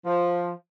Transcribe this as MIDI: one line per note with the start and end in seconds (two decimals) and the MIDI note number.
0.05 0.50 53